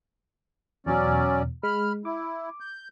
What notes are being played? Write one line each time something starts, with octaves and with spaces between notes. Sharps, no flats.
E2 B2 F#3 C#4 D5
G#3 B5 F6
E4 D6
G6